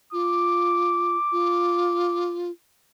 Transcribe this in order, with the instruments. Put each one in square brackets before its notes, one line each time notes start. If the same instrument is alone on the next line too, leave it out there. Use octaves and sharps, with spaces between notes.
[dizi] F4 [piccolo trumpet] D6
[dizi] F4